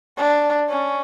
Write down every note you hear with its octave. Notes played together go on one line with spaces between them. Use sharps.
D4
C#4